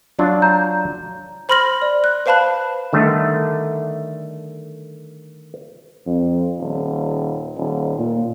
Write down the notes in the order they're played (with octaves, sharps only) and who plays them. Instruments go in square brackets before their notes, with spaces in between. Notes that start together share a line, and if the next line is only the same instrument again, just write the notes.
[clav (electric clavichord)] F#3 D4 F4
[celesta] A#5 G6
[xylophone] C5 B5 C6 F6 A#6 F#7
D5
F#6
B4 C5 F5 A5 B5 F#6
[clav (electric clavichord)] D3 D#3 G3 A3
[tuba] F2
D#1
D#1
A#2